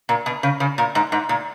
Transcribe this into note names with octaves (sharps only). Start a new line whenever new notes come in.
A#2
B2
C#3
C#3
A#2
G#2
G#2
A#2